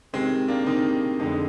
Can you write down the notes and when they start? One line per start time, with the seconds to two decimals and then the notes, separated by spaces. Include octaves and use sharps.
0.13 C3 D#3 G3 G#3 C4
0.48 A#3 D4
0.66 C3 D#3 G3 C4 D#4
1.20 F2 D3 G#3 C4 D#4